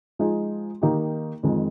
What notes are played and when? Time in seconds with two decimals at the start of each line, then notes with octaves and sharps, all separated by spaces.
0.19 F3 G#3 D#4 G#4
0.82 D#3 A#3 D#4 G4
1.43 F2 D#3 G#3